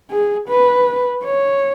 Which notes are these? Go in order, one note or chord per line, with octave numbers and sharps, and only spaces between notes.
G#4
B4
C#5